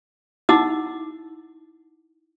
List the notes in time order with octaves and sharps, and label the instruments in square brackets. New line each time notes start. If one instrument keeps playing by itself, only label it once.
[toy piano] D#4 E4 F#5 D6 E6